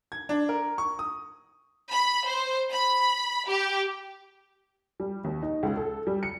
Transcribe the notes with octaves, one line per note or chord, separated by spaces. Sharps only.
G#6
D4
A#4
C#6
D#6
B5
C5
B5
G4
G3
D#2
D#4
C#2
A4
G3
C#7